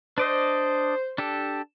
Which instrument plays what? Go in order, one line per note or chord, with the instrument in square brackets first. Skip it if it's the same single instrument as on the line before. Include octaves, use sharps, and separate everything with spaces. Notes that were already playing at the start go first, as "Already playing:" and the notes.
[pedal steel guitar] D4 D5 D#5 [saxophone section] C5
[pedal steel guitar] D4 G4 A4